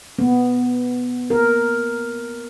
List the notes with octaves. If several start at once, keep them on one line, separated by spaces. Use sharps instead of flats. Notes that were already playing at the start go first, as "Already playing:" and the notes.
B3
A#4